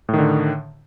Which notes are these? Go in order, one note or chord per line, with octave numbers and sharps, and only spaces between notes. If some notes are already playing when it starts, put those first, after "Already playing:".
A2 D3 D#3